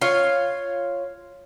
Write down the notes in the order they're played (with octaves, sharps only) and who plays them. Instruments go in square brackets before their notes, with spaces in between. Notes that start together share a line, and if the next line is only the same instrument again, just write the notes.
[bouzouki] F4 C#5 F5